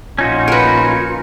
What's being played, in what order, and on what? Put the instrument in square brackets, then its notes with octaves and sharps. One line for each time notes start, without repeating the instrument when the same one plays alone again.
[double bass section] A#1 [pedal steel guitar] C#4 D#4 F#4 [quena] F4
[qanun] A#4 B4